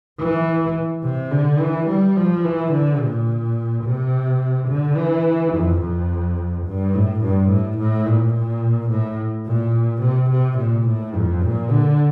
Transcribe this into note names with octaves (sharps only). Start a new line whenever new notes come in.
E3
C3
D3
E3
G3
F3
E3
D3
A#2
C3
D3
E3
F2
F2
G2
A2
G2
A2
A2
A#2
A#2
A2
A#2
C3
C3
A#2
A2
F2
A#2
D3